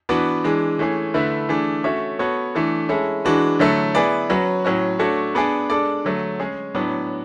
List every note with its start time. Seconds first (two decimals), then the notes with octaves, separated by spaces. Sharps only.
0.09 E3 B3 D4 F#4 B4
0.44 E3 G#3 D4
0.79 E3 A3 C#4 G#4
1.14 D3 A3 E4 B4
1.49 E3 A3 D4 G#4
1.84 A3 C#4 F#4 C#5 E5
2.19 B3 F#4 A4 C#5
2.55 E3 A3 D4 A4
2.89 G#3 C#4 E4 A4
3.25 E3 G#3 D4 F#4 B4
3.59 D3 F#3 A3 E4 A4
3.95 B3 E4 G#4 B4 D5
4.30 F#3 C#4 F#4 B4
4.65 A2 F#3 C#4 F#4
4.99 A3 D4 F#4 A4 C#5
5.35 B3 D4 G#4 D5
5.70 G#3 D4 A4 D5
6.04 D3 F#3 A3
6.40 G#3 C#4 G#4
6.75 A2 F#3 B3 D4